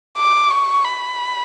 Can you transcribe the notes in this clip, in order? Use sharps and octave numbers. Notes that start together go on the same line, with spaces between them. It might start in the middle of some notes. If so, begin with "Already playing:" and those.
D6
C#6
B5